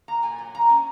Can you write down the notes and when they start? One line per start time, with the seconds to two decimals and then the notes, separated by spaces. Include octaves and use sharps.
0.08 A#3 A#5
0.23 A#2 G#5
0.38 F#3
0.55 A#3 A#5
0.69 C#4 G#5